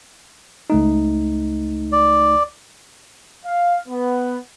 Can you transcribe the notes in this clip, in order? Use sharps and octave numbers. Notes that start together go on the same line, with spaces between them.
C#2 A3 D#4
D5
F5
B3